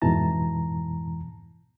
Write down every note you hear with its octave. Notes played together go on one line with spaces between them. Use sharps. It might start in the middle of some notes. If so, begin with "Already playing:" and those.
F2 G#2 B2 E3 A5 A#5